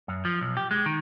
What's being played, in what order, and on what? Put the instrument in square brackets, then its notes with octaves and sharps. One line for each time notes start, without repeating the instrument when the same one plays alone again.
[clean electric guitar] F#2
F3
B1
G4
G#3
D#3